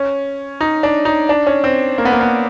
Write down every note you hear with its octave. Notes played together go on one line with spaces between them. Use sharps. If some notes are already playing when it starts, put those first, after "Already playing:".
Already playing: C#4
D#4
D4
D#4
D4
C#4
C4
A#3
B3
A#3
B3